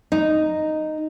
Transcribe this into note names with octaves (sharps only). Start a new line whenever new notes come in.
D#4